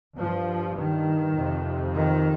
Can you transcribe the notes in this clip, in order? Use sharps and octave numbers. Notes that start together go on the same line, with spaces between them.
G2 F3
D#3
F2 C3
D#3